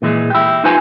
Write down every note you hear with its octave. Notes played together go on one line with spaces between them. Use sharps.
A#2 E3 G#3
E4 G4
D#4 F4 B4 C5 G#5